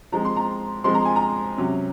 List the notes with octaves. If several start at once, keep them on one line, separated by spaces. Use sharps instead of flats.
F3 G#3 C4 A#5
C6
A#5
F3 G#3 C4 C6
A#5
G#5
A#5
C3 F#3 C#4